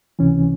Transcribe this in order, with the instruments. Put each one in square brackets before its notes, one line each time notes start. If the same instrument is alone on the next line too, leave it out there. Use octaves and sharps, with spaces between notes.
[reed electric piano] C#2 C3 E3 C#4